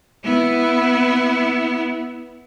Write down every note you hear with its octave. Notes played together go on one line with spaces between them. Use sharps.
B3 E4